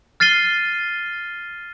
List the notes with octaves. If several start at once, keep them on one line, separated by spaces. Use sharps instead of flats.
F6 A6 C7 D#7 G7